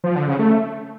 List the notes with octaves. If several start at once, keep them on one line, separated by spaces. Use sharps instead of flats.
F3
D3
C#3
A3